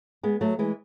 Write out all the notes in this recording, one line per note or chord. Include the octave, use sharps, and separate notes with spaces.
G#3 B3
F#3 A3
E3 G#3